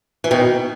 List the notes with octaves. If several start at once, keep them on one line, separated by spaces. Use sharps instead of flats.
E3
B2 D#3